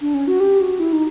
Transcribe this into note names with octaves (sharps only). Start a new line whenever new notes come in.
D4
C#4
F#4
G4
F#4
E4
D#4